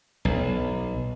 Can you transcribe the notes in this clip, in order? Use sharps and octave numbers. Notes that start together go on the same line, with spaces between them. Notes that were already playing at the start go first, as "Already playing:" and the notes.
B1